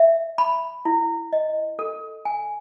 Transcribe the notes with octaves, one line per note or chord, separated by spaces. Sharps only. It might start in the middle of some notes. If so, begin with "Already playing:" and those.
Already playing: E5
B5
E4
D#5
A4
G#5